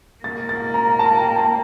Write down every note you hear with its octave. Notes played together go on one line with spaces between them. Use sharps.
A#3 A6
A6
A#5
A5
G5
A5